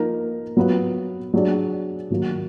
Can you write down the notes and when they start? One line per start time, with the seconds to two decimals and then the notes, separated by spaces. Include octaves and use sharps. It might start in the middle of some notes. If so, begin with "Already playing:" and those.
Already playing: F3 A#3 D#4 A#4
0.57 F#3 B3 F4 B4
1.34 F#3 D4 G#4 D5
2.10 D#3 F#3 A#3